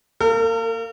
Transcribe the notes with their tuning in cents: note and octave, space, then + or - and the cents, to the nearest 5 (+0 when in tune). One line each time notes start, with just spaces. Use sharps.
A#3 -15 A#4 -45